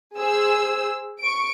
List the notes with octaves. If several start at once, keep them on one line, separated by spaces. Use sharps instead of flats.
G#4 C5 E6
C#6 D7